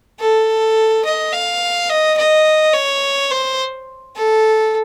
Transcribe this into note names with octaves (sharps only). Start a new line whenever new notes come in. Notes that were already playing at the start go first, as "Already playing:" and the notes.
A4
D#5
F5
D#5
D#5
C#5
C5
A4